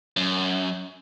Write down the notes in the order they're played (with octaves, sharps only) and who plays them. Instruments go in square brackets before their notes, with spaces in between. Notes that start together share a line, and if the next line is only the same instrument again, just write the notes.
[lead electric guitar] F#2